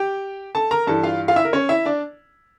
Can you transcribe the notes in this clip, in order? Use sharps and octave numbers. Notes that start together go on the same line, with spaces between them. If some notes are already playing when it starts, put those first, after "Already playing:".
Already playing: G4 G5
A4 A5
A#4 A#5
G2 E3 A4 A5
F4 F5
F4 F5
E4 E5
A#4
C#4 C#5
E4 E5
D4 D5